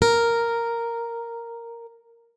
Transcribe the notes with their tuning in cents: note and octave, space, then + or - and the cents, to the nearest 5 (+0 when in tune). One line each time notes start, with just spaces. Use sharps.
A#4 -5